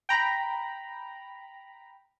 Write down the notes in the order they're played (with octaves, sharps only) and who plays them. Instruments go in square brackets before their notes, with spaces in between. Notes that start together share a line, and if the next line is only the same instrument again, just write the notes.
[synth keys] G5 A#5 B5